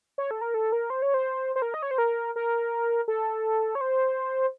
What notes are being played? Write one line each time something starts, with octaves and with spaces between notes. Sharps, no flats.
C#5
A4
A#4
A4
A#4
C5
C#5
C5
C5
A#4
D#5
C#5
C5
A#4
A#4
A4
C#5
C5